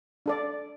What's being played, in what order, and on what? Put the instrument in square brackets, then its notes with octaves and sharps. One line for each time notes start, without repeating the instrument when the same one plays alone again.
[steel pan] D4 A4 D5